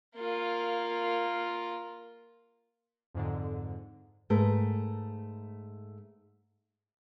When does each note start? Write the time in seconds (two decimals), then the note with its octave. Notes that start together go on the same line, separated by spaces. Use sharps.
0.16 A#3 F4
3.14 F2 G#2 D3
4.30 G#2 A3 A#4 B4